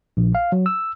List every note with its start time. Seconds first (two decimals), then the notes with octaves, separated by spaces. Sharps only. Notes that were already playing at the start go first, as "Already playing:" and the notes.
0.17 A#1
0.35 F5
0.52 F#3
0.66 E6